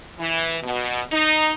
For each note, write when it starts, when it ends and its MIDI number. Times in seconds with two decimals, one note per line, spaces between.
0.19 0.57 52
0.62 1.00 47
1.11 1.52 63